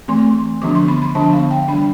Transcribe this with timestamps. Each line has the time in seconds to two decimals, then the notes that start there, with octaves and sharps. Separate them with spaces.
0.08 E3 A3 C4 C6
0.62 D3 F3 B3 D4 D6
0.75 C6
0.88 B5
1.02 B5
1.15 D3 F3 B3 D4 A5
1.33 F5
1.51 G5
1.68 E3 G3 D4 B5